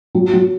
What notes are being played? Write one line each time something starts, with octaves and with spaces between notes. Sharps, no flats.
F#3
F#3